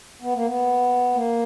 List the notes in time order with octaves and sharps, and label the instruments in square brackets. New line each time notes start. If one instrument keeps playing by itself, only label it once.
[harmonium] B3
A#3
B3
A#3